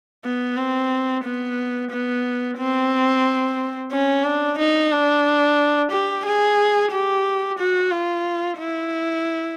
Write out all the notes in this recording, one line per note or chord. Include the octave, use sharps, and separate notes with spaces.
B3
C4
B3
B3
C4
C#4
D4
D#4
D4
G4
G#4
G4
F#4
F4
E4